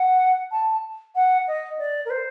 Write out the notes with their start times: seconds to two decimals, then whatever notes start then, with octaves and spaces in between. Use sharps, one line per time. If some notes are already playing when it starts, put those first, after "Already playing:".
Already playing: F#5
0.51 A5
1.15 F#5
1.47 D#5
1.78 D5
2.05 A#4
2.10 C5